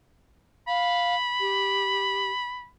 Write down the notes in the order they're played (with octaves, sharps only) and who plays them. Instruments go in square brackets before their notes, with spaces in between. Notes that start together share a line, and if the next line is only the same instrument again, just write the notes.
[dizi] F5 [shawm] B5
[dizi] G4